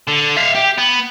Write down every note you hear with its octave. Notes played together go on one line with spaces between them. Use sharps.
D3
E5 F5
G4
B3